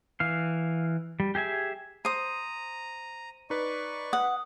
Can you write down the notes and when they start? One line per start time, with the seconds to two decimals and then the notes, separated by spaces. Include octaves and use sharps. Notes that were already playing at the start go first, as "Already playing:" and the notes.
0.20 E3 F5
1.20 G3
1.35 G4 G#4 E5 G#5
2.05 C5 A#5 D#6 D#7
3.50 D#4 B4 D5 C#6
4.13 F#5 D#6